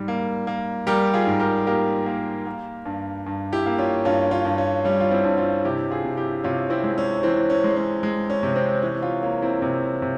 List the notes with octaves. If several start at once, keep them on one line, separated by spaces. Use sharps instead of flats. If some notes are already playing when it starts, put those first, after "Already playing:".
Already playing: G#2 G3
A#3
A#3
G3 G4 A#4
F4 G#4
G#2
G4 A#4
A#3 G4 A#4
A#3
A#3
G2
G2
E4 G4
A#3
C#4 F4
G2 C#4 F4
C#4 F4
G2
C#4
G3 C#4
F4
C4 E4
G2
C#4 F4
C3 E4 G4
F4 G#4
C3
E4 G4
C3 C#4 F4
C4 E4
G#3
C#4
E3 C4
C#4
G#3
C#4
G#3
C#4
C3
C4
E3 C#4
C#4 F4
A#3 C#4
C4 E4
C3 C#4
C3